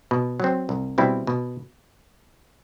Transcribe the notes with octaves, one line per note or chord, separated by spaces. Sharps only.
B2
F#3 C4
C2
B2 G3 C4 E4
B2